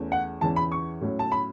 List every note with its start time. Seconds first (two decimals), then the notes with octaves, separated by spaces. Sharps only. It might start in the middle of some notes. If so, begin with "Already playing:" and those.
Already playing: E2 E3 A3 C#4
0.12 F#5
0.41 E2 E3 C#4 A5
0.56 B5
0.72 C#6
1.01 A2 F#3 C#4
1.19 A5
1.32 B5